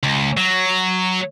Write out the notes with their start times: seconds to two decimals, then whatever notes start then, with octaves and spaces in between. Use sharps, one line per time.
0.03 C#2
0.37 F#3